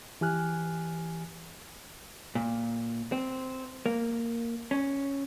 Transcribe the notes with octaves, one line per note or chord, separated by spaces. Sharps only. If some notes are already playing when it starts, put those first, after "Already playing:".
E3 G4 G#5 F6 F#6
A#2
C4
A#3
C#4